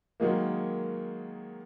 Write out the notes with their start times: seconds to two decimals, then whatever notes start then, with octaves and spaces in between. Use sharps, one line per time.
0.20 D#3 F#3 G#3 A#3